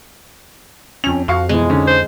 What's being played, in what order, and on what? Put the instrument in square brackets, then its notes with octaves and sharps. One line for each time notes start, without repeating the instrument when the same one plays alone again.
[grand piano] F2 F7 [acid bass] C#4
[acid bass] F2 [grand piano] F#4 F5 C#6
[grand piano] B2 E3 [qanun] G#3
[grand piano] D3 C#4 D#4
[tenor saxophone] C5